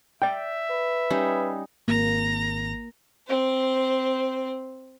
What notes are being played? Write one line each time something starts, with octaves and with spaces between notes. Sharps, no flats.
D5 E5 G5
B4
G3 C#4 D#4
G#1 A#3 A#5
C4 C5